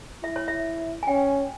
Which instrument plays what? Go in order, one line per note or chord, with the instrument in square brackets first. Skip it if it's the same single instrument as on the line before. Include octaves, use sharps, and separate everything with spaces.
[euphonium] E4 [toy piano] E5
[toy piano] C#5
E5
G#5
[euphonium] C#4 [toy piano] G5